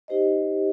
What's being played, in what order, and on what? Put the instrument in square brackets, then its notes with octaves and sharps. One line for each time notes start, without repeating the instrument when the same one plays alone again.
[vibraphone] D#4 G4 C5 D#5